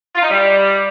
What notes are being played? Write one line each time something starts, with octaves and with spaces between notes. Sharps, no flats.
F4
D#4
G3